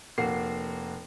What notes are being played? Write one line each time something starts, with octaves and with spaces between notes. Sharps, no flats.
F1 A#3 F#4 C7